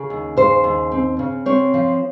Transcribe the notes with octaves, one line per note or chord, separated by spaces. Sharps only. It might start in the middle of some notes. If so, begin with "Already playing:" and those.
Already playing: C#3
D#2
C#3 C5
D#2
C4
C#3
C4 C#5
F3